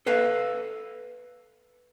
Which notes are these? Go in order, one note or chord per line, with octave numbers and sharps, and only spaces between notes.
A4 B4 F5